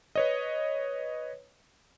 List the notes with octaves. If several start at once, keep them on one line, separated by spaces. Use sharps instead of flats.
B4 C#5 D#5